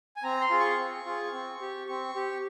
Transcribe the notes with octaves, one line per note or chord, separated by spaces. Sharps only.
G#5
C4 A#5
C6
F4 G#4
C#6
C4
F4 G#4
C4
G4
C4 C#6
G4